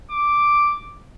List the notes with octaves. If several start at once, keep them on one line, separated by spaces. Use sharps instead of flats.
D6